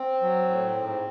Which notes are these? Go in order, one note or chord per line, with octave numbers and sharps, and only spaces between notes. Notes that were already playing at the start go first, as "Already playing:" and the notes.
Already playing: C4
F#3
A2
G#2